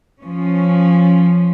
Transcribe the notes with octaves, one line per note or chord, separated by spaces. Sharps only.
F3 C#4